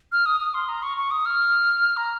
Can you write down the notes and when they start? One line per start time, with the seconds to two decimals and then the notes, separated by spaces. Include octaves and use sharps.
0.12 F6
0.26 D#6
0.40 D#6
0.54 C6
0.69 A#5
0.82 C#6
0.97 C#6
1.11 D#6
1.25 F6
1.97 A#5